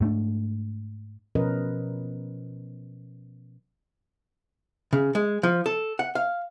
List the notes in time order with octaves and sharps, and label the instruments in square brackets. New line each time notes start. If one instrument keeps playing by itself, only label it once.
[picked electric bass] G#2 A3 B3 D4
[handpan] B2 F3 C#4 A#4 B4 D#5
[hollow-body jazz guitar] C#3
G#3
F3
A4
F#5
F5